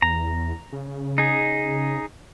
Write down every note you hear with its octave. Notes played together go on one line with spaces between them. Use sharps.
E2 A#5
C#3
D#4 G#4